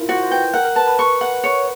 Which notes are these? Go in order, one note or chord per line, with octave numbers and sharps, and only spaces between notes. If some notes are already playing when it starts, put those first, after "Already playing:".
Already playing: E4 F4 A#4
F#4 C5
C5
B4 G5
A#4 F#5
A#4
B4 A5
B4
C#6
F#5
C#5